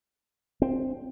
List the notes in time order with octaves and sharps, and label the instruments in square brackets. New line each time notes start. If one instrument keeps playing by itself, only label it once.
[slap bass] C4